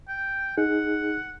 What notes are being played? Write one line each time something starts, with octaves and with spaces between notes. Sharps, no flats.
G5
D#4 G#4 F#5